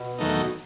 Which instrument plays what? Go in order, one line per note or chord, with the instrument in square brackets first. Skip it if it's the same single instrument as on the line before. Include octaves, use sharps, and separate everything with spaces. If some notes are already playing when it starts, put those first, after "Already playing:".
Already playing: [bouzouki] B2
[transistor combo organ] E2 D#3 F#3 A3 D#4